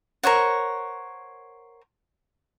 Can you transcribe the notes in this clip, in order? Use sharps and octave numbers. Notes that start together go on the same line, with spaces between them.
A#4 C5 C#5 F#5